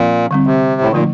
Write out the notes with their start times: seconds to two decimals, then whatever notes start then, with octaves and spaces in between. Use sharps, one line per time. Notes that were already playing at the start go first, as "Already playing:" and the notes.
Already playing: A#2 F3 C4
0.31 D3 G3 C4
0.47 C3
0.81 A2
0.92 A#2 D3 F3 A3 D#4